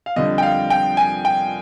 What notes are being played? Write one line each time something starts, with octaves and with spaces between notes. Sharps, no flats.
F5
F2 D3 G3 D#5
G5
F5
G5
G#5
G5